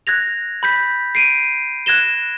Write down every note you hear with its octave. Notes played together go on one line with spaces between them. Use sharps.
F#6 G#6 A#6 F7
B5 G6 B6
C7 D7 D#7
F#6 G#6 A#6 E7 G7